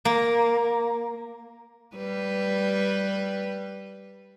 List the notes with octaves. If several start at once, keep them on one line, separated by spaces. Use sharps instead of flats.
A#3
G3 B4